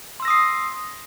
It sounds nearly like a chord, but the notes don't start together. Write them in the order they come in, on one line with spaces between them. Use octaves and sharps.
C6 E6 A#6 D#6 C7